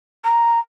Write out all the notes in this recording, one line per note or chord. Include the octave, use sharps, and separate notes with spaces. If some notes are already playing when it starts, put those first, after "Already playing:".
A#5